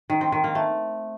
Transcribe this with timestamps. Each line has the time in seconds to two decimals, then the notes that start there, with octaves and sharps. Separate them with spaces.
0.10 D#3
0.21 C4
0.32 D#3
0.44 A#3
0.55 A3